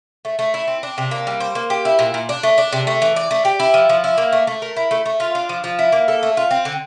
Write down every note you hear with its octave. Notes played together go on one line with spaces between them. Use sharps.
A3
A3
E4
C4
D4
C3
A#3
G3
C5
A#3
G4
E4
A#2
A#2
D4
A3
D4
C3
A3
E3
D5
A3
G4
E4
F3
F3
E4
A#3
A3
A3
A#4
E4
A3
A3
F4
D4
F3
F3
E4
A#3
A4
A3
F4
C4
D3